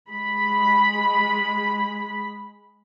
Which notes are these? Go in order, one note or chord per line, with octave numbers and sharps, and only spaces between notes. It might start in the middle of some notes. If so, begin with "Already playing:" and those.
G#3 B5